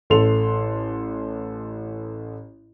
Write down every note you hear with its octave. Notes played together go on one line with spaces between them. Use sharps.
A1 A4 C6 F7